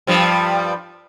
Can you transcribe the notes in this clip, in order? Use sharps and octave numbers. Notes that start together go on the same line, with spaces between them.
G2 F3 G3